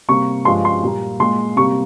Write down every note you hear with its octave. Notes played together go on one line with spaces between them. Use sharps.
C3 G3 A#3 C#6
G2 F3 G#3 C6
C6
A#2 G3 A#3
A#2 G#3 C6
C3 G3 A#3 C#6